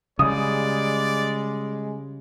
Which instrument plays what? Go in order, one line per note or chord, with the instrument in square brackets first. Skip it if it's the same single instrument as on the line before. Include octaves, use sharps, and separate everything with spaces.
[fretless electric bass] C#3 G3 [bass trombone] G#3 [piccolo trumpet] D5 [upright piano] D#6